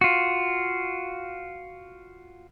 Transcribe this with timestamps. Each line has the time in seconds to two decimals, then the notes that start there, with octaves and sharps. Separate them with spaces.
0.01 F4 F#4